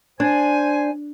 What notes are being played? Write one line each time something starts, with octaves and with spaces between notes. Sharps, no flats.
D4 C5 G#5